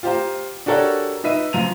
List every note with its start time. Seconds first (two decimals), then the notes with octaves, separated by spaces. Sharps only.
0.03 F4 G4 C5 F5 A#5
0.66 D4 F#4 G4 A4 A#4 C#5
1.24 D#4 B4 E5 D#7
1.53 F#2 F3 A#5 D#7 F7